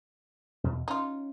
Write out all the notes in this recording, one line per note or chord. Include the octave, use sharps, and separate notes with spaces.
E2 B2
C#4 D#4 F4